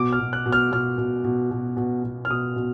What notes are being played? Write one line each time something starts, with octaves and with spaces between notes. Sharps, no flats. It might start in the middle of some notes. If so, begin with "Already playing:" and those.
Already playing: B2 D6
F6
B2
F#6
B2
F6
B2 F6
B2
B2
B2
B2
B2
F6
B2 D#6
B2